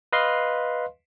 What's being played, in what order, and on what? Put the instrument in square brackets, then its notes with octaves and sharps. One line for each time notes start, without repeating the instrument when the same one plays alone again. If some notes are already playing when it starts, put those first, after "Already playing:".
[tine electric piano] B4 D#5 F5 C6